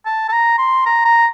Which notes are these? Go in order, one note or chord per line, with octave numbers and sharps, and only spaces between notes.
A5
A5
A#5
C6
A#5
A#5